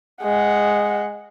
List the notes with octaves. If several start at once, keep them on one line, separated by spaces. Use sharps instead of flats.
G#3 F#5